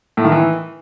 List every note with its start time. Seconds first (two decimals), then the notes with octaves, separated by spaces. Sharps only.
0.17 A2
0.25 D#3
0.32 E3